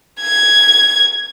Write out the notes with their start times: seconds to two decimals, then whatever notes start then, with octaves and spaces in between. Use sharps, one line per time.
0.21 G#6